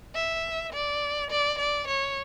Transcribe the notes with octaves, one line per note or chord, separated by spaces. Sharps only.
E5
D5
D5
D5
C#5